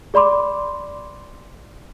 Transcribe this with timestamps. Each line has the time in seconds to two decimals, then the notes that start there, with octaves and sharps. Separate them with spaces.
0.14 G#4 D5 B5 C6 D6